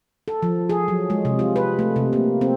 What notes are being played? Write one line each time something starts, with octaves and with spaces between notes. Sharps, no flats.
A4
F3
G#4
F#3
G#3
C3
F4
B4
A3
C3
A#3
C4